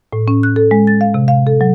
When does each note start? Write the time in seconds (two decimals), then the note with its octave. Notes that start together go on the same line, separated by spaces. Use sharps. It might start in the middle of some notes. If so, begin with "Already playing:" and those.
0.13 A2
0.28 C#4
0.43 F#6
0.56 A4
0.71 G#3
0.87 A6
1.01 F5
1.14 C3
1.28 F5
1.47 A4
1.61 F#3